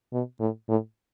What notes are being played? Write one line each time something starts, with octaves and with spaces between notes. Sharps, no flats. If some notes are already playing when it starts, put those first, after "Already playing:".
B2
A2
A2